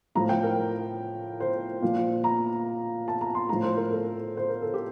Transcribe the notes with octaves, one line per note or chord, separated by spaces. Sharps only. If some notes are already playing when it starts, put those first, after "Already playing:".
A2 F3 A#5
G5
A#4
C5
A#2 F3
A#5
A5
A#5
C6
A2 F3 A#5
C5
A#4
A4
C5
A#4
A4
G4